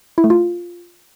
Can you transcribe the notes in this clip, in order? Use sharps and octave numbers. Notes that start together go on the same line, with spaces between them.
E4
A3
F4